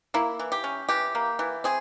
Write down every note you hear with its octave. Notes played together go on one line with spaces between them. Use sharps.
A#3 E4
E3
G4
C#4
E3 G4
A#3
E3
C4 G#4